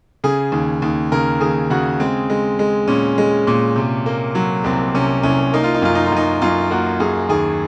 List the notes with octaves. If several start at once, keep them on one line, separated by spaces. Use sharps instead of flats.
C#3 G#4
D#2
D#2
C#3 A#4
D#2 G#4
C#3 F#4
G#3 C4
G#3
G#3
A#2 C#4
G#3
A#2
C3
A#3
F#3
C2 C4
C3 C#4
C2 C#4
A#3 D#4
F4
D#4
F#2 F4
D#4
F4
F#2 D#4
F#2 F4
A#3 F#4
F#2 G#4
D#2 G#4